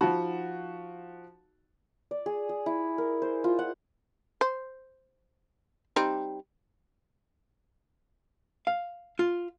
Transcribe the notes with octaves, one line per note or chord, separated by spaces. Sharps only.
F3 D#4 F#4 B5
D5
G#4
G#4
E4
A#4
C5
F4
F#5
C5
G3 C4 D#4
F5
F4